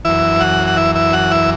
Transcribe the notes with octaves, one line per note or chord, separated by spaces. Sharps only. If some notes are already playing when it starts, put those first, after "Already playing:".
F#2 E3 E4 E5
F#4 F#5
F#5
E4 E5
E4 E5
F#4 F#5
E4 E5